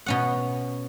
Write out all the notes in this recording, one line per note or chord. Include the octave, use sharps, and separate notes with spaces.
B2 C#4 F#5